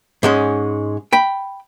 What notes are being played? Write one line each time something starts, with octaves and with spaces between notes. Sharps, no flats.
G#2 G#3 C#4
G5 B5